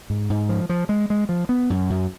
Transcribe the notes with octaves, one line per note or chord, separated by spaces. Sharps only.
G#2
G#2
F3
F3
G#3
G#3
F3
B3
F#2
F#2